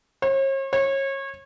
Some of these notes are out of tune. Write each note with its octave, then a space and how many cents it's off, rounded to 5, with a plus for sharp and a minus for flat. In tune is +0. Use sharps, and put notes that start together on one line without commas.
C#5 -45
C#5 -30